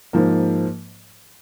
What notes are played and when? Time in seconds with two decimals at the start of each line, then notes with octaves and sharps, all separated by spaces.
0.13 G#2 F3 A#3